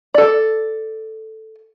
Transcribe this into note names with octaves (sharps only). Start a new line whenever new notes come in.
A4 D5